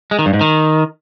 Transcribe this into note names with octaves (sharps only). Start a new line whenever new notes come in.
G#3
D#3
G2
G#2
D#3